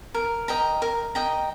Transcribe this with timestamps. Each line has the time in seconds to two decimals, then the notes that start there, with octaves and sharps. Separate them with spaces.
0.14 A#4
0.48 D#5 G5 A#5
0.82 A#4
1.15 D#5 G5 A#5